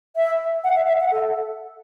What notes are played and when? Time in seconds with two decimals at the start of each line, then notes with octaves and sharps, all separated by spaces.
0.16 E5
0.64 F#5
0.76 E5
0.88 E5
1.00 F#5
1.11 A4